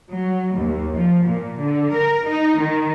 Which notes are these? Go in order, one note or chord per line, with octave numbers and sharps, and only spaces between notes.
F#3
D#2
F3
A#2
D3
A#4
D#4
D#3